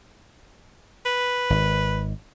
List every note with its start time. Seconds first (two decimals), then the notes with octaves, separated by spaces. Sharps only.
1.06 B4
1.50 G#1